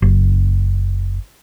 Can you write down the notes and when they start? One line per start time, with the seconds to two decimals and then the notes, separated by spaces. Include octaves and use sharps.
0.02 F#1